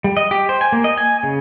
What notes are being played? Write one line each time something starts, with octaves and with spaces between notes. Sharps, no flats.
G3
D#5
G4
C5
G#5
A#3
D#5
G#5
C#3